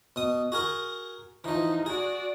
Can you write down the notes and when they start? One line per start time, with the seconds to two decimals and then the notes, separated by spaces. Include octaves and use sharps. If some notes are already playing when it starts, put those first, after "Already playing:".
0.16 B2 D#6
0.52 F#4 G#4 A#4
1.44 E3 F3 D#4
1.86 F#4 G#4 D5